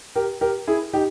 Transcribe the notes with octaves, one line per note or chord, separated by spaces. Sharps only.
G4 A#4
G4 A#4
E4 G#4
D#4 G4